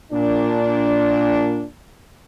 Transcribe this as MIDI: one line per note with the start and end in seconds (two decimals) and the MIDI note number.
0.12 1.65 46
0.12 1.65 62